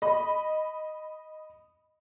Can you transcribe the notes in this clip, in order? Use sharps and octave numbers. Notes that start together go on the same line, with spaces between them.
D#5 B5